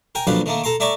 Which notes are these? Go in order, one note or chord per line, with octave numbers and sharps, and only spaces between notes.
A#4 G5 G#5
A#1 F2 F#3 B4 D5 F5
D#3 A3 A#3
A4 A#5 C6 D6
A3 D5 E5 A#5 C#6 D6